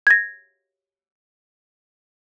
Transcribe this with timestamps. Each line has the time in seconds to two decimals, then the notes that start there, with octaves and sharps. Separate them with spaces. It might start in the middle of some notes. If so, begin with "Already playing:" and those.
0.07 G#6 A#6